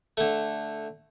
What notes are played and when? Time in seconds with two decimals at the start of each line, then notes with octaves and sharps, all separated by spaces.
0.17 D3 A3